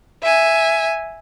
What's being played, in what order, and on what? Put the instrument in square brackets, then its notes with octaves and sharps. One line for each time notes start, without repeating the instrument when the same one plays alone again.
[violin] E5 G#5